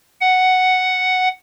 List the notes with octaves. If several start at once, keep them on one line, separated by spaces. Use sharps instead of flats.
F#5